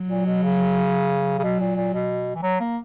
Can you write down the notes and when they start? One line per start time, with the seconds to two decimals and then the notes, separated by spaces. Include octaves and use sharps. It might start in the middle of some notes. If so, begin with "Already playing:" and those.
Already playing: F#3
0.08 A#2
0.26 B2
0.43 C#3
1.39 C#3
1.43 B2 F#3
1.60 A#2
1.76 A#2
1.94 B2
2.35 E3
2.43 F#3
2.60 A#3